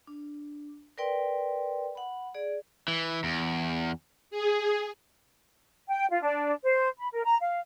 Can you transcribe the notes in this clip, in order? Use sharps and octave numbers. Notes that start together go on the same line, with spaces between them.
D4
A#4 B4 D5 G5 C6
F#5 B5
G#4 D5
E3
E2
G#4
G5
F4
D4
C5
B5
A#4
A#5
F5